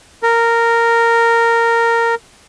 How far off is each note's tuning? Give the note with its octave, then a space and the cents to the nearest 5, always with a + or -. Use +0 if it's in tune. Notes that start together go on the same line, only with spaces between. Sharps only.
A#4 -10